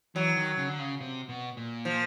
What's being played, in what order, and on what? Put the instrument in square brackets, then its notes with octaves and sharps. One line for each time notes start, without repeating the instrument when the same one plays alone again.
[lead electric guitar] E3 [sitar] F#3
[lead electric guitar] D#3
C#3
D3
C#3
C3
B2
A#2
[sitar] F3